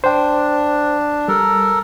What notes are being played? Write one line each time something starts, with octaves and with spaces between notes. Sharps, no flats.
D4 C5 G5
G3 A4 A#4